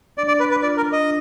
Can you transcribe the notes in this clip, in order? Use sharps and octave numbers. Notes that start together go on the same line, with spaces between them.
D4 D5
D5
D4 B4
B4
F4 D5
A#4
D4
D#5